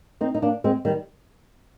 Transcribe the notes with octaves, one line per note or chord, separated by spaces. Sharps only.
C4 D#4
D#4
A#3 D4
G#3 C4
D#3 G3